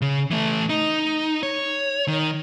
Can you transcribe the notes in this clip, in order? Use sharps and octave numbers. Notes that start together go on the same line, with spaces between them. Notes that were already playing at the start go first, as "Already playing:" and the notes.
C#3
E3 A3
D#4
C#5
D#3